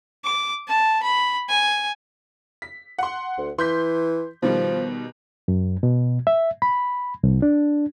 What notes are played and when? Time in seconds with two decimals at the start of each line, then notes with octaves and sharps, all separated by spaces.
0.24 D6
0.68 A5
1.03 B5
1.49 G#5
2.62 B6
2.98 F#5 C6
3.38 D2
3.59 E3 C6 G6 B6
4.42 B2 D#3 F3 G3
5.48 F#2
5.83 B2
6.27 E5
6.62 B5
7.23 C2
7.42 D4